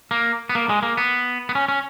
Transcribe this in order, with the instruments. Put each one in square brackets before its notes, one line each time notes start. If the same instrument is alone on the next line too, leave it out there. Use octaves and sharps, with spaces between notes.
[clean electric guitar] A#3
B3
A#3
G#3
A#3
B3
B3
C#4
C#4